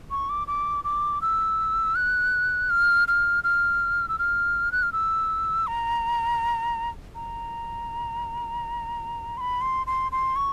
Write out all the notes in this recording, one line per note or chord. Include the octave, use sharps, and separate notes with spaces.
C#6
D6
D6
D6
E6
F#6
F6
F6
F6
E6
F6
F#6
F6
E6
A#5
A#5
C6
B5
C6
C6
C6
C#6